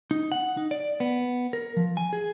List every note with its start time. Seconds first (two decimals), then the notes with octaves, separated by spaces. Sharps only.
0.11 D#4
0.32 F#5
0.57 D#4
0.71 D5
1.00 B3
1.53 A#4
1.77 F3
1.97 G#5
2.13 G#4